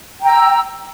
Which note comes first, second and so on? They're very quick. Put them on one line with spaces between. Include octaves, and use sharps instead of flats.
G5 A#5 E6